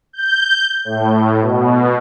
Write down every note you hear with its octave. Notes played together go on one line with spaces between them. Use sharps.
G6
A2
B2